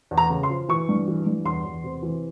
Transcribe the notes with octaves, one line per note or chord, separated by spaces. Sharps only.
E2
A#5
C#3
C6
F3
E3 C#6
G2
E3
G2
E2 C6
E2
C3
E3